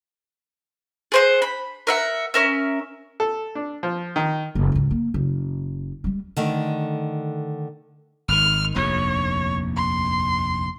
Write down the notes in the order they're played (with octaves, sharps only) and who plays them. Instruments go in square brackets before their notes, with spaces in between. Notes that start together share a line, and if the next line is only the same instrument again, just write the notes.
[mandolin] G#4 C5 F#5
B5
A#4 E5 F#5
C#4 A#4 E5
[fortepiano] A4
D4
F3
D#3
[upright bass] F#1
C#2 G#2
A#3
F#1
G3 G#3
[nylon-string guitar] D3 D#3 A3
[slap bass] G#1 D#3 [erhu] F6
[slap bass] F1 A#1 D#2 [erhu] C#5
[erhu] C6